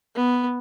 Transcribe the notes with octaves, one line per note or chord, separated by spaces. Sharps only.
B3